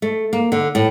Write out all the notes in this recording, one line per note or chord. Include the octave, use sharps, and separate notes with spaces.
A3
A#3
D3
A2